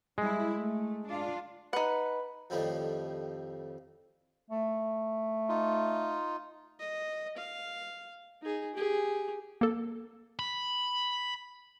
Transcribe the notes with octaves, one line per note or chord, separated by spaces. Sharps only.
G3 G#3 E4
A3
D4 F4 F5
D#4 B4 F#5
F2 A2 D#3 F3 G3 A3
A3
D#4 F4
D#5
F5
D#4 G#4
G4 G#4
A#3 A4
B5